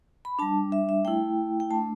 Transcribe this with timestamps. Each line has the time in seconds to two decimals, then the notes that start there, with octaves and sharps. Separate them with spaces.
0.25 B5
0.39 G3 D4 A5
0.72 E5
0.89 E5
1.05 A3 E4 G5
1.60 G5
1.70 A3 D4 A5